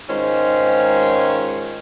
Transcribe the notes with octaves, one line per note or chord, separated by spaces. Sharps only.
G#2 D#3 C#4 F4 C5